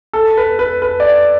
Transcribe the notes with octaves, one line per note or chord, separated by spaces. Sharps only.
A4
B4
B4
B4
D5